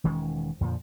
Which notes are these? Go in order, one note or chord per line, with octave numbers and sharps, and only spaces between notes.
E1 D#3 G#3 C#4
F2 A#2 D3 F3